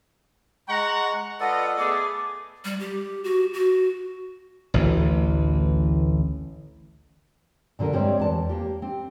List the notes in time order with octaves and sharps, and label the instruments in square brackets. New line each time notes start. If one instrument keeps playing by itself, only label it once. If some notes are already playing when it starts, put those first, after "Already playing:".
[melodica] G#3 C#6 [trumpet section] F#5 A#5
[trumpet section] F4 B4 D#5 [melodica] A4 D5 [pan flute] F#5
[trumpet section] A3 B3 G#4 [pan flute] D6
[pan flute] G3
G4
F#4
F#4
[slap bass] A1 D2 E3
[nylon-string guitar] A#2 D3 G3 A#4
G2 G3 G#3 C4 C#5 D5
E2 A5
A#3 G4
C4